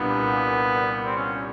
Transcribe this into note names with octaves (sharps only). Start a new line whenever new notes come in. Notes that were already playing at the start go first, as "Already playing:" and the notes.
Already playing: C2 A#2 G3 A#3 B3 D4
C4
C#4